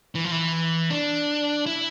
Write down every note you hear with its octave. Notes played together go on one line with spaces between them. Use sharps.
E3
F3
E3
D4
E4